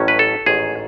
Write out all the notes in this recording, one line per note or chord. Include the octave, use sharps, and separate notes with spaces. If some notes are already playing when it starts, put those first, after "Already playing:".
Already playing: A1 A2 F#3 C#4
B4
A4
A1 G#2 D#3 A3 G#4